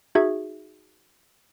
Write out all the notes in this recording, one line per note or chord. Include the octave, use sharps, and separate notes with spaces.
D#4 F#4 G#4 E5 G#6